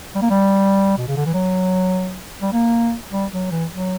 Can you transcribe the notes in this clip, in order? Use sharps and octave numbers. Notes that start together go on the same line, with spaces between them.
G3
A#3
G3
B2
C#3
D3
E3
F#3
G3
A#3
G3
F#3
E3
F#3